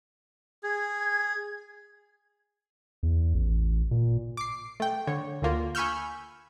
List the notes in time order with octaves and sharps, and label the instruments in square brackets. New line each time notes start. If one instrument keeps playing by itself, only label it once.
[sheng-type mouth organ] G#4 [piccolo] G#6
[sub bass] E2
A1
A#2
[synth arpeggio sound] D6 C7
A3 G5
D3 C#5
D2 D3 A#3 F4
G#5 B5 C#6 E6 F6 G6